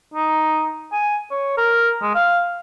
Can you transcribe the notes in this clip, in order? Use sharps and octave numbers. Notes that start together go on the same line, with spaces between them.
D#4
G#5
C#5
A#4
G#3
F5